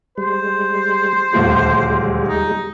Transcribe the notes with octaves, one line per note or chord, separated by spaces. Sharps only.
G3 G#3 C5
D#1 D2 F3 G3 G#3
D#4